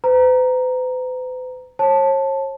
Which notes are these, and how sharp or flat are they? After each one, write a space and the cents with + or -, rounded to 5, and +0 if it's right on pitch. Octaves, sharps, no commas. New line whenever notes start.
B4 +45 A#5 +0
C#5 -40 A5 +0